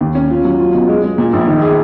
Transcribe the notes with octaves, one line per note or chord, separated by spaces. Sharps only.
D#2
C#4
F4
F#3
F4
B2
G#3
G#3
A#2
A#1
D#3
G#4